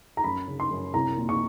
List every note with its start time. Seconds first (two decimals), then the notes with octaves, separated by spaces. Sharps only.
0.17 A#5
0.24 F#2 B5
0.48 C#3
0.60 C6
0.71 F#2
0.94 C2 A#5
1.17 A#2
1.29 C#6